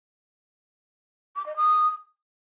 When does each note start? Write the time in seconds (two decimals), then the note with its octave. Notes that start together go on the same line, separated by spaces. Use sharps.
1.36 D6
1.46 D#5
1.56 D#6